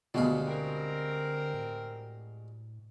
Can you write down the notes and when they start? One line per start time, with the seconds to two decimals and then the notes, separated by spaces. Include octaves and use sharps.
0.14 D2 B2 D3 G3 G#3 F5
0.48 C4 A#4
1.54 A2